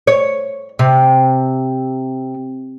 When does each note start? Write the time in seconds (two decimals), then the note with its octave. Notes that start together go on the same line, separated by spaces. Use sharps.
0.07 C#5
0.79 C3